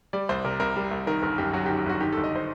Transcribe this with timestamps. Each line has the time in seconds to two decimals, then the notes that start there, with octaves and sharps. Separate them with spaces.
0.13 G3 D5
0.29 C2 C5
0.44 C3 A#4
0.60 C2 A#4
0.76 G3
0.91 C2
1.07 D#3 A#4
1.23 G1 A#4
1.38 F#2 G4
1.53 F#3 F#4
1.66 G4
1.70 D#3
1.77 G4
1.86 G1 F#4
2.00 D#3 G4
2.12 G1 A4
2.24 D#5
2.36 C5